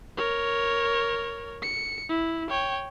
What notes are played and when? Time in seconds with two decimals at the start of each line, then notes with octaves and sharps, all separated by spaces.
0.17 A#4 C#5
1.62 C#7
2.09 E4
2.50 C#5 G5